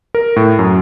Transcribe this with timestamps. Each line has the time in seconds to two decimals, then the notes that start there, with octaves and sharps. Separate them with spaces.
0.15 A#4
0.36 A2
0.59 F#2